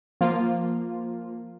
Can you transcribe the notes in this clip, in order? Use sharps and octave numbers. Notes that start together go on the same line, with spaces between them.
F3 A#3 F4